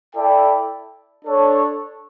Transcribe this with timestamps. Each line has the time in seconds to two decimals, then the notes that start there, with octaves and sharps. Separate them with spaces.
0.14 E4 A4 D5 G5
1.25 D4 A4 C#5